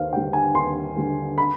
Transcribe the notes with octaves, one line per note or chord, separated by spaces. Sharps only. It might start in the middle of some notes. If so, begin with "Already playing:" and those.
Already playing: D#2 C5 F5
D3 G3 G5
G#5
D#2 C6
D3 G3
B5